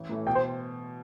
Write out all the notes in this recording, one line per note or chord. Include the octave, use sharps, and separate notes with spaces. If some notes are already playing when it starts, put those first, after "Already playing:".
Already playing: A1
A2 E3 A3 E4
B2 G5
C5